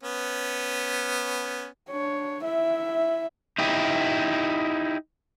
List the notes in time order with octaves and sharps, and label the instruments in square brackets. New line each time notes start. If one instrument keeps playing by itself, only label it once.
[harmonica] B3 C#4
[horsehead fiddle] D4 C#5
E4 E5
[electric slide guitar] D#4 E4 G4